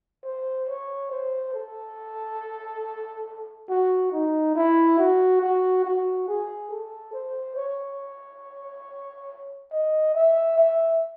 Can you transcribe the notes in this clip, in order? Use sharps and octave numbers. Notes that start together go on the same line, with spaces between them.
C5
C#5
C5
A4
F#4
D#4
E4
F#4
F#4
F#4
G#4
A4
C5
C#5
D#5
E5
E5